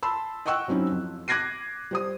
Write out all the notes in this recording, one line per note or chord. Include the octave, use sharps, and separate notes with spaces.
A5 B5 C6 E6
D#5 F#5 G5 C#6 E6 F#6
F#3 C4 C#4 D#4 E4
F2
D6 F#6 G#6 A#6 C7 D#7
G3 C5 D#6